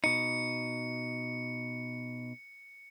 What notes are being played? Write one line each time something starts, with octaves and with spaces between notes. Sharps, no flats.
B2 D#4 C#7